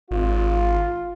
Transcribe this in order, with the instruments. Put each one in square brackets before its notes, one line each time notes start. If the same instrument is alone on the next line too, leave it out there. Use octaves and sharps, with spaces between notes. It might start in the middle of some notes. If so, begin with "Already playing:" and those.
[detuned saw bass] G#1 [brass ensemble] F4